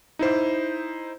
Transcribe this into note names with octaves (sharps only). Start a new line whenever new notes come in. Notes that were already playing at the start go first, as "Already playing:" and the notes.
D#4 E4 C5